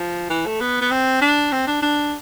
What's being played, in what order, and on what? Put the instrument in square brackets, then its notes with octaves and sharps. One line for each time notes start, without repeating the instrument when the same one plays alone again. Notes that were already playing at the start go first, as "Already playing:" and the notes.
Already playing: [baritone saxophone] F3
E3
A3
B3
B3
C4
D4
C4
D4
D4